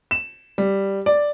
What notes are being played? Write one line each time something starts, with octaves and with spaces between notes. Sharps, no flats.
E7
G3
D5